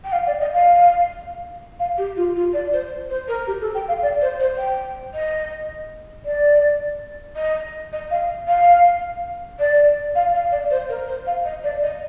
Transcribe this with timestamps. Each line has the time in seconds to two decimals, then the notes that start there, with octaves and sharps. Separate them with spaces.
0.04 G5
0.12 F5
0.27 D5
0.40 D#5
0.54 F5
1.80 F5
1.98 G4
2.16 F4
2.36 F4
2.53 D5
2.73 C5
3.10 C5
3.28 A#4
3.47 G4
3.61 A4
3.75 G5
3.88 F5
4.02 D5
4.22 C5
4.40 C5
4.58 G5
5.14 D#5
6.25 D5
7.36 D#5
7.93 D#5
8.11 F5
8.48 F5
9.60 D5
10.15 F5
10.34 F5
10.52 D5
10.71 C5
10.89 A#4
11.08 C5
11.27 F5
11.45 D#5
11.64 D5
11.82 D#5